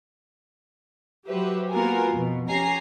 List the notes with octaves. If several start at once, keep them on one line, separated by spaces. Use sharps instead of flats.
F#3 F#4 G4 B4 C5 E5
A#3 B3 F4 F#4 A#4 G#5
F2 B2
C#4 G4 G#5 A#5 C7